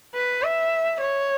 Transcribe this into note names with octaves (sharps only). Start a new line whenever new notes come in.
B4
E5
C#5